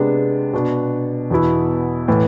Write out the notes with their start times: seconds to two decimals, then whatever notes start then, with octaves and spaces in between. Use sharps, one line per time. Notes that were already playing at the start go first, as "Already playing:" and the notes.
Already playing: C3 G#3 B3 D4
0.53 B2 B3 D4
1.30 E2 B2 B3 E4
2.08 A2 E3 B3